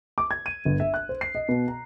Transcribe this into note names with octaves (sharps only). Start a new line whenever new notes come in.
D6
G#6
D#7
G1
E5
F#6
C5
C7
D#5
B2
A#5